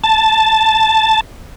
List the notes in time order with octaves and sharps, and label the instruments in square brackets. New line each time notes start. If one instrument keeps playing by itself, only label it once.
[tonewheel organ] A5